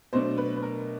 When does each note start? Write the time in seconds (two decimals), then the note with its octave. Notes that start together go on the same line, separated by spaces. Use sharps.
0.13 B2 F#3 A3 D4 C5
0.37 B4
0.56 B4
0.63 A#4